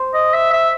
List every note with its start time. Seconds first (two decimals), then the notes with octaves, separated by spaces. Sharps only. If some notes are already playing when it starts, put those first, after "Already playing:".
Already playing: C5
0.14 D#5
0.33 E5
0.53 E5